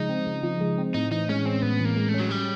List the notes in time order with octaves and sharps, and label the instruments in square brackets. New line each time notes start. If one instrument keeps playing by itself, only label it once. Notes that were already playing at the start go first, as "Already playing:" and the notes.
Already playing: [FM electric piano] C#3 F3 G#3 [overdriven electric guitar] D#4
[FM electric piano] C4
C#3
F3
G#3
C4
[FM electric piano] A2 [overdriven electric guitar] D#4
[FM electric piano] E3 [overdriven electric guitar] D#4
[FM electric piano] G#3 [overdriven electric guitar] C#4
[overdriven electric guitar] C4 [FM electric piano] C#4
[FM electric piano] A2 [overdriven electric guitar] B3
[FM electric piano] E3 [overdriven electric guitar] A#3
[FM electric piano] G#3
[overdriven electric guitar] A3
[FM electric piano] C#4
[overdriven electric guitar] F#3
G3